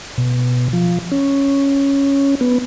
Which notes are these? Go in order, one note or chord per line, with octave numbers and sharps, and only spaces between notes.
B2
F3
C#4
B3